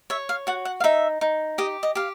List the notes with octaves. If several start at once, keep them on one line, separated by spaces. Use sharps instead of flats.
C#5 E5
F5
F#4 F#5
F#5
F5
D#4 E5
D#4
G4 D#5
D#5
G4 F5